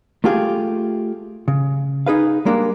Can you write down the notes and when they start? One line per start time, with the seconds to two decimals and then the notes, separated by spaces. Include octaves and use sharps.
0.24 A3 F4 G4 G#4 F5
1.48 C#3
2.06 D#4 G#4 B4 F5
2.45 G3 G#3 A#3 D4 G4